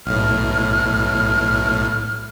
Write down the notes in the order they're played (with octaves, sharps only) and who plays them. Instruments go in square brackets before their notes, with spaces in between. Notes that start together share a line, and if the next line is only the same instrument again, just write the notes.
[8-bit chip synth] B1 A2 [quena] F6